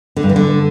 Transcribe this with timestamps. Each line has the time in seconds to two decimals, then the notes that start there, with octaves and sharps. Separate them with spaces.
0.16 D3
0.23 G2
0.29 E3
0.36 D3